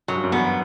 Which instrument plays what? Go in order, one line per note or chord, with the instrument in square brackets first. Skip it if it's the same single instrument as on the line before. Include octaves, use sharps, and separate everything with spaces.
[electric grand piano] F#2 [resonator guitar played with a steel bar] F#3
[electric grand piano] G2
F#2
[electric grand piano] E2 [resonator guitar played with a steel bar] B3